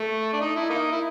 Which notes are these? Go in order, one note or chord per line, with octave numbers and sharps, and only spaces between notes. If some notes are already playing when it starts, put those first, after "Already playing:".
Already playing: A3
D4
D#4
E4
A#3 D#4
E4